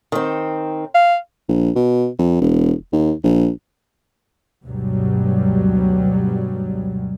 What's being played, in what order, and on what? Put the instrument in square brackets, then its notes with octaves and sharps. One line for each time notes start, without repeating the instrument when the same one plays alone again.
[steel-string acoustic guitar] D#3 C4
[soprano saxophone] F5
[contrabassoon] A#1
B2
F2
E1
D#2
A#1
[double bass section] D2 G2 B2 F#3 G3